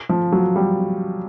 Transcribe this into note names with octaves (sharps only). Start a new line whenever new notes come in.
F3
F#3
G3